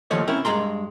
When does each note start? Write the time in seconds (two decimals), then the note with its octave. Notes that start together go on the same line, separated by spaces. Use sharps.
0.10 D#2 D#3 F3 A3 C#5 D#5
0.28 C4 C#4 E4 A#4
0.45 G2 G#3 A#5 C6